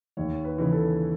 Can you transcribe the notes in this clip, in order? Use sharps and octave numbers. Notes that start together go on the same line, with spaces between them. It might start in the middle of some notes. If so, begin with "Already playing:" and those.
D#2 C#5
B4
C#3 E3
A4